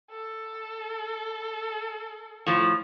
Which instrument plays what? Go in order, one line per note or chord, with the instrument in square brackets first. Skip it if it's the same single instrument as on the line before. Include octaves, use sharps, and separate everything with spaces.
[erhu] A4
[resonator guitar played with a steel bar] A2 F3